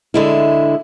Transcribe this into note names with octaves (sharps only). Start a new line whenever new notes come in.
D3 G#3 E4